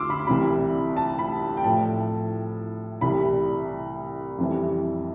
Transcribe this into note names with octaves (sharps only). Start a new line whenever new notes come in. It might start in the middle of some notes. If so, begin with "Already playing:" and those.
Already playing: D2 D3 C6 D6 E6 F6
B5
C2 C3 E3 G3 B5
A5
B5
G5
A2 F3 A5
C2 C3 E3 G3 B5
F2 C3 E3 G3